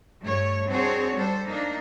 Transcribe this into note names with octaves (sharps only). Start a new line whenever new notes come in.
G2 A3 C#5
C4 D4 F#4 G#4 C5 C#5
G3 D4 A4 C5
A#3 D4 D#4